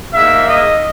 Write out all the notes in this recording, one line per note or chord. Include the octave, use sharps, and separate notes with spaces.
G#2 D#3 A#3 E5
D#5